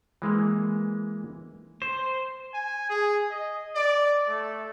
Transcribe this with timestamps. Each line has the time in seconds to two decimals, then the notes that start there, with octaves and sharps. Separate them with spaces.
0.22 E3 G#3 A#3
1.82 C5
2.54 G#5
2.89 G#4
3.30 D#5
3.75 D5
4.28 A3